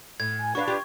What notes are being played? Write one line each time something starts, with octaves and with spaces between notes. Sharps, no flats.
A2 G#6
G#5
D4 F#4 B4 D5 F5 C#6
F4 G4